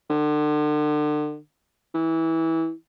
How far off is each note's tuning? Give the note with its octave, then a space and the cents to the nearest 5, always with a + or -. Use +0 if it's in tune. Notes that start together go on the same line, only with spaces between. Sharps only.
D3 +35
E3 -20